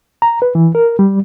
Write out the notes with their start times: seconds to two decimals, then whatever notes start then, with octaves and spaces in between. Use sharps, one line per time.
0.22 A#5
0.42 B4
0.55 E3
0.75 A#4
0.99 G3